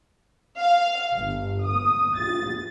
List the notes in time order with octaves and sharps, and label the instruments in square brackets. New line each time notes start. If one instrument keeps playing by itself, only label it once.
[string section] F5
G1
D#6
A6